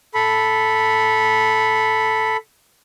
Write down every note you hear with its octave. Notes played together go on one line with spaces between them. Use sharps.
A4 B5